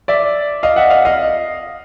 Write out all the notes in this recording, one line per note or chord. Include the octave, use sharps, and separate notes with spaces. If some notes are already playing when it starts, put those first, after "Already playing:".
D5 E5
D#5 F5
E5 F#5
D#5 F5
D#5 F5